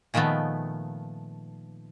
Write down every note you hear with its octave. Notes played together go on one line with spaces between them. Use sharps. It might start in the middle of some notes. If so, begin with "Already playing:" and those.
A#2 D#3 F3 A3 B3